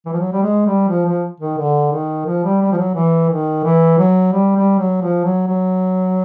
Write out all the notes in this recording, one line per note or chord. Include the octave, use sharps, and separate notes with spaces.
E3
F3
F#3
G3
G#3
G3
F3
F3
D#3
D3
D#3
F3
G3
G3
F3
F#3
E3
D#3
E3
F#3
G3
G3
F#3
F3
F#3
F#3